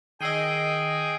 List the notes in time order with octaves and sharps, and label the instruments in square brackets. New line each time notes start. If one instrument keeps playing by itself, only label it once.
[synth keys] D#3 D#5 [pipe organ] G#4 G5 [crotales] E6 C7 D#7